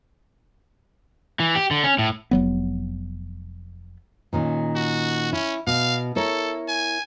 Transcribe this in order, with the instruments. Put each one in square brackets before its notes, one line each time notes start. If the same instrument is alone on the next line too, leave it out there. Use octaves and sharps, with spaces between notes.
[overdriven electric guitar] E3
G4
D3
C#4
A2
[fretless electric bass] F1 F#3 B3
[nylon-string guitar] A#2 D#3 C#4
[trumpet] F#4
[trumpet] C#4 [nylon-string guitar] E4
[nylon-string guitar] B2 [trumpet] F5
[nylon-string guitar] E4 A#4 C#5 [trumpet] A4
[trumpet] G#5